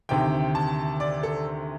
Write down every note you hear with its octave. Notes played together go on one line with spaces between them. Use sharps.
D2 C3 D#3 G5
A5
D5
A4